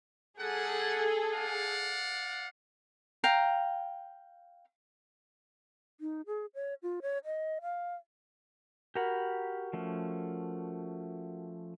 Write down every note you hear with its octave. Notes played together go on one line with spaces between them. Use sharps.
G3 G#4 A4 F#5
D5 F5 F#5
F5 G5 A#5
D#4
G#4
C#5
F4
C#5
D#5
F5
F#4 G4 A#4 F#5 A#5 B5
F3 A3 C#4